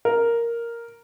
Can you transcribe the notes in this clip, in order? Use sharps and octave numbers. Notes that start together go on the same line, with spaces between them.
A#4